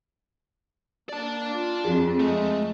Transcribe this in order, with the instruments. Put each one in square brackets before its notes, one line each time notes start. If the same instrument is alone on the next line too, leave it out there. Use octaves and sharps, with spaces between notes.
[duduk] A#3 [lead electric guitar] D5 A5
[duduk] F4
[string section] F2 [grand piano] G#4
[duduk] G#3 [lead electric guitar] A3